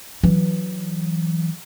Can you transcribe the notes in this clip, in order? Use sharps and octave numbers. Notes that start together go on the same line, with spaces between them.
E3 F#3